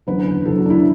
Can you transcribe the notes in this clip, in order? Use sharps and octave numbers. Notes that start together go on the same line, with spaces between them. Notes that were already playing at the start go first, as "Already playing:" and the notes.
F#1 E2 D3 F#3 B4
F#1 E2 D3 F#3 A4
F#4
D4
E4